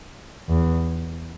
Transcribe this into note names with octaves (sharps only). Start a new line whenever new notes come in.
E2